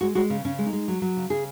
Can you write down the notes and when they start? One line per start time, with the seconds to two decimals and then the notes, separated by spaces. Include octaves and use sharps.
0.01 G#3 F#4
0.15 G#3 F#4
0.30 C#3
0.45 C#3 C#4
0.59 G#3
0.66 D#4
0.73 G#3
0.88 F#3
1.02 F#3
1.17 C#3
1.30 C#3 G#4